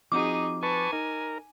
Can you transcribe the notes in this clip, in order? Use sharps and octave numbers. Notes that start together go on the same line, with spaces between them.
F3 C4 D#4 F#4 G#4 D6
B4 G#5 A5 C#6
D#4 A#4